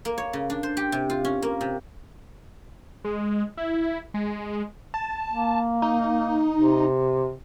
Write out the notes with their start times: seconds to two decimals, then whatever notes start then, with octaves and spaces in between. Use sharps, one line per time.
0.05 A#3
0.18 C#5
0.33 C#3
0.50 D4
0.63 C5
0.77 G4
0.92 C3
1.10 F4
1.25 C#4
1.42 A#3
1.61 C3
3.04 G#3
3.57 E4
4.14 G#3
4.94 A5
5.31 A#3
5.82 D#4
6.57 C3